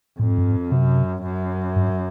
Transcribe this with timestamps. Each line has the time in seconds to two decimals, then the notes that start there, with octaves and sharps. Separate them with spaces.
0.19 F2 A2
0.28 G#2
0.38 G2
0.49 G#2
0.71 F#2 C3
1.24 F#2
1.76 G2